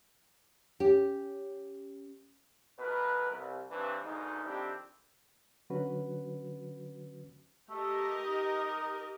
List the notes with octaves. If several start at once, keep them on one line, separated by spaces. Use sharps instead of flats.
C#4 G4
A1 B2 A#4 B4
C2
G2 E3 C4 D4 B4
D2 G#2 B2 D#4
F2 D#3 C4 D4 E4 G4
D3 F#3 C#4 F#4 B4
A3 G4 A#4 D#5
D#4